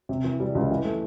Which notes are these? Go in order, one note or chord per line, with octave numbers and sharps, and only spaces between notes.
C3
E3
G3
C#2
E3
A3